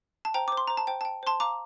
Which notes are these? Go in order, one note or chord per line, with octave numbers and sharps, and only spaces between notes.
A5
C5 G5 A#5
C5 D6
C6
C5 A#5
A5
C5 G5
G5 A5
C5 A5 C6
F5 A#5 D6